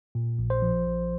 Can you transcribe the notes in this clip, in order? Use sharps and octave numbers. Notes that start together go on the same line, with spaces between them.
A#2
A#1
C5
F3
A#1